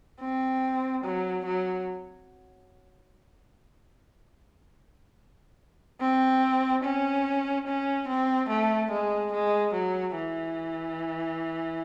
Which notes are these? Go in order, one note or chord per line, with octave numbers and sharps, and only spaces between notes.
C4
F#3
F#3
C4
C#4
C#4
C4
A3
G#3
G#3
F#3
E3